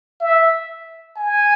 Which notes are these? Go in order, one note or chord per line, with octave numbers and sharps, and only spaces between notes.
E5
G#5